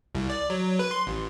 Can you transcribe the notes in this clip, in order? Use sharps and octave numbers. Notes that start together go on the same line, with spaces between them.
C2
D5
F#3
B4
C6
A1